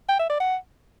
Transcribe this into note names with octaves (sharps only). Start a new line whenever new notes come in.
G5
E5
D5
F#5